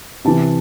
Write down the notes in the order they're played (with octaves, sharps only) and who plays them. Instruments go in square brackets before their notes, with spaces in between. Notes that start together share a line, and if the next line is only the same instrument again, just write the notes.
[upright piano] C3 E3 A5